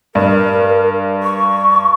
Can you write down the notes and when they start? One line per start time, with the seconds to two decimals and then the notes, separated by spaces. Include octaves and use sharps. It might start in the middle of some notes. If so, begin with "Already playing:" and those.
0.15 G2 A#4
1.23 C#6